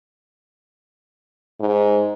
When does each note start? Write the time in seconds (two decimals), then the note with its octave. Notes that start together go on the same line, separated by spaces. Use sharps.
1.60 G#2